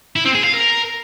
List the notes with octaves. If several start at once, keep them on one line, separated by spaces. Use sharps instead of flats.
E4
C4
G#4
F5
A#4